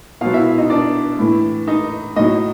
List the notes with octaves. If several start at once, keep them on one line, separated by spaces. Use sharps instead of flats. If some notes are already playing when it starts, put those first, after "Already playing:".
B2 F#3 F4 F5
E4 E5
D#4 D#5
D4 D5
A2 E3
D#4 D#5
A2 F#3 D#4 D#5